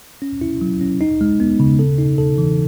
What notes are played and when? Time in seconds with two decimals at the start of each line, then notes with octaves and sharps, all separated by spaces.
0.22 C#4
0.41 E4
0.61 F#3
0.81 C#4
1.01 D#4
1.21 G#3
1.40 B3
1.60 C#3
1.79 A4
1.98 D#4
2.18 A4
2.38 E3